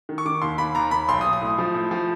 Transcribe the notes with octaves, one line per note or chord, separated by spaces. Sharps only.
D#3
C#6
D#3 D6
D#2 C6
D#2 B5
D#2 A#5
D#2 B5
B1 C6
D#6
B1
D#6
A2
F3
A2
F3